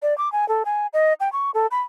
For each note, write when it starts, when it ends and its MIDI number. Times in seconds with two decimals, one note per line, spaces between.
0.02 0.16 74
0.18 0.31 86
0.32 0.47 80
0.49 0.63 69
0.65 0.87 80
0.93 1.13 75
1.20 1.31 79
1.33 1.51 85
1.54 1.67 69
1.71 1.81 83